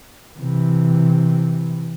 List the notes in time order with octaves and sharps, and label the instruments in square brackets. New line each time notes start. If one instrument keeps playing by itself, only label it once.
[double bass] C3 E3